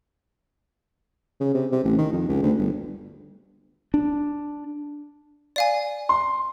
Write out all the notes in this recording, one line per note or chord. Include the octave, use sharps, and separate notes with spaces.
C#3
C3
C3
A1
D#3
F2
C#2
D2
G1
D4
D5 F5 G#5
C6